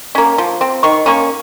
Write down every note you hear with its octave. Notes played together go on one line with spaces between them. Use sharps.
A#3 C#4
F3
C4
D#3 C#6
A#3 C#4 C#6